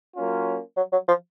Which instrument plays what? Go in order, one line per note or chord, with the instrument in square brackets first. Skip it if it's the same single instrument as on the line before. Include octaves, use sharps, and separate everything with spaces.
[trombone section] F#3 A#3 C#4 F4
[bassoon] F#3
F#3
F3